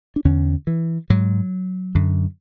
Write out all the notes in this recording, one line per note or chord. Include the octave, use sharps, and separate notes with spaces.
D4
E2 D3 C#4
E3
G#2 F#3
F#2 D3